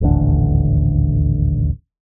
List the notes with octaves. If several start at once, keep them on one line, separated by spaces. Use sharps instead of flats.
D#1 A1 D2 D3